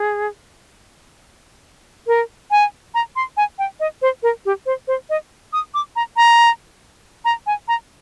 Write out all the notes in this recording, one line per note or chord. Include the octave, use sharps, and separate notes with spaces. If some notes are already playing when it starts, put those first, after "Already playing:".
Already playing: G#4
A#4
G#5
A#5
C6
G#5
G5
D#5
C5
A#4
G4
C5
C5
D#5
D#6
D6
A#5
A#5
A#5
G#5
A#5